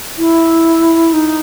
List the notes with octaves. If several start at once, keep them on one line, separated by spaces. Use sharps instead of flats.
E4
D#4